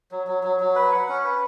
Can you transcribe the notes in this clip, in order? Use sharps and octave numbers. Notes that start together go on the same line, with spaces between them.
F#3
F#3
F#3
F#3
B4
F#5
C#4
B4